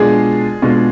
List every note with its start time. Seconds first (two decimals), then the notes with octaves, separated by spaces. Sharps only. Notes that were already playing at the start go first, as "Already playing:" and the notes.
Already playing: B2 G#3 D4 F4 G#4
0.62 B2 G#3 D4 F4